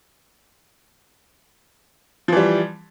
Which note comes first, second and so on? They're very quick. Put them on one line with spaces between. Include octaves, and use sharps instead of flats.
F3 E3 G3